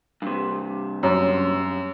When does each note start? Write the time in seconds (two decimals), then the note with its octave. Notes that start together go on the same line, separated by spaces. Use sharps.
0.22 G2 C3
1.03 F#2